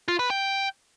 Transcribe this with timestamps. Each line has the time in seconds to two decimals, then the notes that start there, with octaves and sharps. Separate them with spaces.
0.08 F4
0.19 B4
0.30 G5